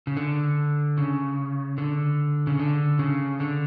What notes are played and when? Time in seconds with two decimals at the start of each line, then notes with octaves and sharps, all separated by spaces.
0.07 C#3
0.17 D3
0.98 C#3
1.78 D3
2.47 C#3
2.59 D3
2.99 C#3
3.40 D3